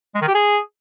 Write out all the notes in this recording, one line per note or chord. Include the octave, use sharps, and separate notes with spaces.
G#3
D#3
G4
G#4